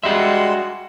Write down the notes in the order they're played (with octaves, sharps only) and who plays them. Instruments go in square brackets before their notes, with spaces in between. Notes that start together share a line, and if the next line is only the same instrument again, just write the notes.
[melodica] G3 G#3 C6 [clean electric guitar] F#4 E5